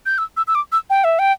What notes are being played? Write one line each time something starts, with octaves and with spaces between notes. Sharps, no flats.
G6
E6
E6
E6
D6
E6
G5
E5
G5